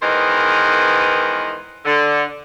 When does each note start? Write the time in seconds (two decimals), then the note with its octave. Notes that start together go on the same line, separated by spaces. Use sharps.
0.01 D#3 E3 G#3 B3 A#4 C5
1.85 D3